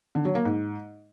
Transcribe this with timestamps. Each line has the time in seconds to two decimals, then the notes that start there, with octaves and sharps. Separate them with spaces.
0.15 D3
0.25 F#3
0.35 A#3
0.45 G#2